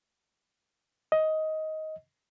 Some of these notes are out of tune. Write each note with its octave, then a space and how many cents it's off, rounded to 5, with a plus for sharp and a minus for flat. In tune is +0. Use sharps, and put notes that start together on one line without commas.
D#5 +15